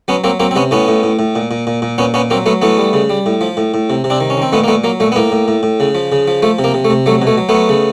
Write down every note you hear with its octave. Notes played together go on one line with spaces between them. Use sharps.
F#3 B3 C#4
F#3 A#3 C4
F#3 A#3 C4
C4
C3 B3 C#4
A2 B3 C#4
A2
A2
A2
A#2
A#2
A#2
A#2
A#2 B3 C#4
A#2 B3 C#4
F#3 A#3 C4
F#3 A3 B3
E3 A3 B3
G3
C#3
G3
A2
F3
A2
A2
C3
C3
C4 D4
D#3
C#4
D#3 C4
A#2 A3 B3
A#3
A#2 A3 B3
F#3 A#3
A#2 A3
B3
A2 A#3
A2
A2
A2
C#3
F3
C#3
F3
F3 A3
C3
A#3
C3
A3
C3
F#3 A3
B2
A3
F#3
A3 B3
F#3
C#3